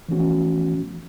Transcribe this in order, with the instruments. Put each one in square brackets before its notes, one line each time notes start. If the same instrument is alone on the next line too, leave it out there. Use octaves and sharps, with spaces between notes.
[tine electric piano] E3 F3 A3 B3 C#4 F#4